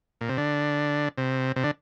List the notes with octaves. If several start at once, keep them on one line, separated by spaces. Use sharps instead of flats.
A#2
C3
D3
C3
C3
D3